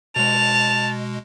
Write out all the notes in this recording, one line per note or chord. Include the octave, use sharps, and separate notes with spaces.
B2 G#3 A5 F7